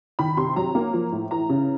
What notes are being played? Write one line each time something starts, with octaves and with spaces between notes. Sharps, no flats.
D#3 B5
C3 C6
F#3 A#5
A#3
F3
A2
E3 A#5
C#3